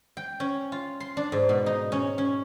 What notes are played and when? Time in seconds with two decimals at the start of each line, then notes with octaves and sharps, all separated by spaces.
0.17 G5
0.40 C#4
0.72 F4
1.00 C6
1.17 D4
1.32 G#2
1.49 B2
1.66 D#4
1.92 C#4
2.18 C#4